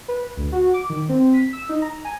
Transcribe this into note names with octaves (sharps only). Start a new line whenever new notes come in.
B4
D2
F#4
D6
D#3
C4
B6
E6
D#4
A#5
G#5